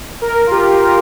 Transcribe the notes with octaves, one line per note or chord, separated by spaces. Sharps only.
A#4
F4
G4
A#4